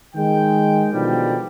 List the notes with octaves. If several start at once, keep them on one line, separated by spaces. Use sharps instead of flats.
D#3 G#3 G5
B2 D3 D#3 F3 G3